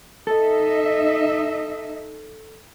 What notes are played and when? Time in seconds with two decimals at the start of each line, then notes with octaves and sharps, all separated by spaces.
0.27 D#4 A4 D#5 E5